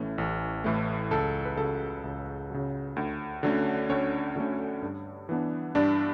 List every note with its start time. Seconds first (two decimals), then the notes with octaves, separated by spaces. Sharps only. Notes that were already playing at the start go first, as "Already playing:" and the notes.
Already playing: A1 A2 E3 A3 C#4
0.18 A1
0.64 A2 E3 A3
1.11 C#2 A4
1.45 B4
1.57 C#3 F#3 A4
2.04 C#2
2.50 C#3 F#3
2.96 D2
3.43 D3 F#3 A3 C#4
3.89 D2 C#4 C#5
4.36 D3 F#3 A3 C#4
4.82 G2
5.29 E3 B3 D4
5.75 G2 D4 D5